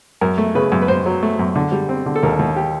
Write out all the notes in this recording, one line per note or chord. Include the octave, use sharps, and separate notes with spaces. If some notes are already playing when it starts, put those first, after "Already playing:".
F#2 A#4
A3
C#3 B4
F#2
B4
F#2 C5
F#3
A3
F#2
D3
G3
C4
D3
A4
D#2 A#4
D#2
G4